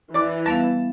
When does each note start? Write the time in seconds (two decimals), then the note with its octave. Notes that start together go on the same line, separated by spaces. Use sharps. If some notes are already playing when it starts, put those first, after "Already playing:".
0.14 E3 D5 D6
0.46 G3 B3 F5 A5